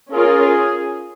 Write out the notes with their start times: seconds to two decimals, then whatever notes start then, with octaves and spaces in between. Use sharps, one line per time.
0.12 C#4 F4 G#4 A#4